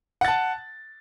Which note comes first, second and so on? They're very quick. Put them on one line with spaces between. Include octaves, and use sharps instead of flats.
F#5 A6 A5